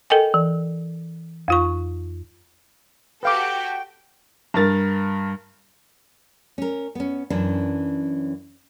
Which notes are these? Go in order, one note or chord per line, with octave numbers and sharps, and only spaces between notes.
A4 A#4 D#5 G5 G#5
E3
F2 F4 C#6
F#4 G4 A4 B4 F5 G5 D6
G2 A#4 A6
C#4 A#4
B3 C#4
F#2 E3 C#4 D4